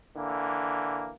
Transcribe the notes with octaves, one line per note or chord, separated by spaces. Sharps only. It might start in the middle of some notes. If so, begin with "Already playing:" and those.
D3 E3 A#3